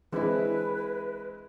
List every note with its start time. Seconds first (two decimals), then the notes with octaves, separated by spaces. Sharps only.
0.12 E3 G#3 C4 D4 E4 B4